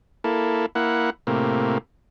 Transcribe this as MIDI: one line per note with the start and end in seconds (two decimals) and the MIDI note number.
0.24 0.66 58
0.24 0.66 64
0.24 0.66 69
0.75 1.10 58
0.75 1.10 64
0.75 1.10 78
1.27 1.78 45
1.27 1.78 48
1.27 1.78 58